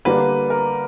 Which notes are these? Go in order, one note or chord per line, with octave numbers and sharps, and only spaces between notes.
D3 G3 A#3 D4 B4
A#4